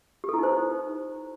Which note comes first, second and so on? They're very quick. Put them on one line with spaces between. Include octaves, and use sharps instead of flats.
G4 A4 E4 D#4 C5